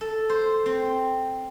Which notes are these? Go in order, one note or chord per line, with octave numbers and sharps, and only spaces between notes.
A4
C5
C4